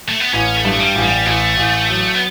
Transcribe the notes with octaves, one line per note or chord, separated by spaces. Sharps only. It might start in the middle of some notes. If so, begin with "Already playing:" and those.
A3
B3
A1 C#4
A3
G2
G3
A1
G3
A1 A3
A1
F#3
B3